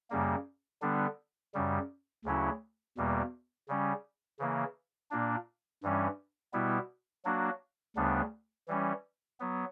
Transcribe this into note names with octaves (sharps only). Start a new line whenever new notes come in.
F#2 C#3 G3 A#3
D3 G3 B3 D4
F#2 C#3 G3
D2 C#3 F#3 C#4 E4
E2 B2 G3 A#3
C#3 G3 C#4
C#3 E3 A#3
A#2 A#3 D4
G2 E3 G3 C#4
B2 G3 B3 E4
F#3 A#3 D4 F#4
D2 C#3 G3 B3 D4
E3 G3 C#4
F#3 B3